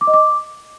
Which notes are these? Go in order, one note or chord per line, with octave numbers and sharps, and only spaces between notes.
D6
D#5
D6